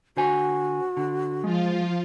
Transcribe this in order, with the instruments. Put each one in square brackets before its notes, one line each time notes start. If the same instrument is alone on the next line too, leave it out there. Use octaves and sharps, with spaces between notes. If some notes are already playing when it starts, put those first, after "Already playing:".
[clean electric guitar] D3 C5 G#5 [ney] F#4
[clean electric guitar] D3
[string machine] F3 F4 [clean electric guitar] G#3